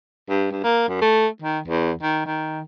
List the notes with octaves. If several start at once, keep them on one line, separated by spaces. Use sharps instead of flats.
G2
G2
A#3
F#2
A3
D#3
E2
D#3
D#3